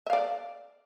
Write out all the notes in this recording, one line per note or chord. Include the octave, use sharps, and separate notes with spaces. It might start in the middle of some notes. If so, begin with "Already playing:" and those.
D5 E5 F5